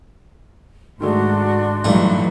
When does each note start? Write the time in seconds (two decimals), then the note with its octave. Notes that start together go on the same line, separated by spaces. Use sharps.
1.01 G#2 D#3 G#3 A3 D4 F#4 C6
1.84 A#1 G2 E3 F#3 A3 D#4